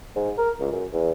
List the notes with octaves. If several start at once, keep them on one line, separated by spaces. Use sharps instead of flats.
G#2
A#4
C#2
F#2
E2